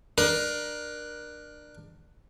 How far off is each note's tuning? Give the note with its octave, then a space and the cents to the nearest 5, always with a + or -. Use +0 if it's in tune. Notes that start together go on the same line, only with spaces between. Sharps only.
D4 +25 A#4 +25